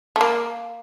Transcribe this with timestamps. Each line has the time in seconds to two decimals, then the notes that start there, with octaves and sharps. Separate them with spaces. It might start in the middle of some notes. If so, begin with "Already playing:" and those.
0.16 A3
0.21 A#3